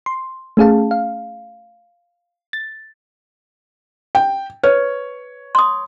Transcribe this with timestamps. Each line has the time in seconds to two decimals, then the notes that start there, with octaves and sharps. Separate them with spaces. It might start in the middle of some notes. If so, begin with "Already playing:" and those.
0.06 C6
0.57 A3 C#4 G#4 F5 A5
0.91 F5
2.53 A6
4.15 G5
4.64 B4 C#5
5.55 C6 D#6